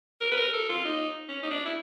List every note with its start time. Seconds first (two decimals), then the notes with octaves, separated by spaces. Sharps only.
0.21 A#4
0.31 B4
0.37 A#4
0.53 A4
0.69 F4
0.85 D#4
1.29 C#4
1.43 D#4
1.51 D4
1.66 E4